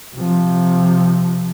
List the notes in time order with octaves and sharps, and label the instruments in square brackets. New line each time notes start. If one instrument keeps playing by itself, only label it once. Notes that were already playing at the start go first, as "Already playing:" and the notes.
[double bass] C3 F3